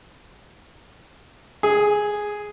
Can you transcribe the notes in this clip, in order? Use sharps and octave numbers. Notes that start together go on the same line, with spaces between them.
G#4